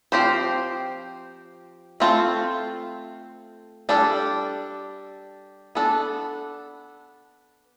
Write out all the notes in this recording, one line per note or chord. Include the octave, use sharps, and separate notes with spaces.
F3 C4 G4 C5
A3 C4 F4 A4
G3 D4 A4
B3 D4 A4